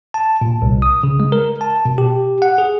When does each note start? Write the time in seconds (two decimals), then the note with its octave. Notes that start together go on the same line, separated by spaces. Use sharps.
0.14 A5
0.41 A#2
0.62 C2
0.82 D#6
1.03 C#3
1.20 G#3
1.32 A#4
1.61 A5
1.85 B2
1.98 G4
2.42 F#5
2.58 G#4